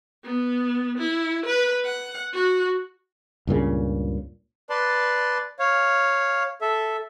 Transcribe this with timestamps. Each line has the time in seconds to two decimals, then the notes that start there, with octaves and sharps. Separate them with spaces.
0.24 B3
0.98 E4
1.46 B4
1.85 F#5
2.34 F#4
3.47 C#2 G2 A#2 C#3
4.70 B4 D5 A5 C6
5.59 C#5 F5
6.61 A4 E5